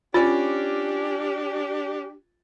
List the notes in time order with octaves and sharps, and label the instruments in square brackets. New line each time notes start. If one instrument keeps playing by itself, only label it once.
[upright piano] C#4 A6 [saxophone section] D4 G4 [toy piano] F4